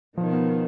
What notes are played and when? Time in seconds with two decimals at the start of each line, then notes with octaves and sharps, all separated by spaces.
0.17 B2 D#3 F3
0.32 B3